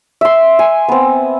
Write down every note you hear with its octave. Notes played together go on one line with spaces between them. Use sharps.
E5 C6
G#5
B3 C4